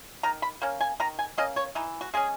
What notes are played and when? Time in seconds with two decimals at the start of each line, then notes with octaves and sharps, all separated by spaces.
0.23 D#3 A#5
0.42 B5
0.62 A#3 C#4
0.81 G#5
1.00 D#3 A#5
1.19 G#5
1.38 A#3 C#4 D#5
1.56 C#5
1.75 E3 D#4
2.01 F#4
2.14 G#3 C#4 G#4